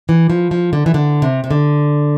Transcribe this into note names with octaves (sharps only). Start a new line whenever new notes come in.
E3
F3
F3
D3
E3
D3
C3
C3
D3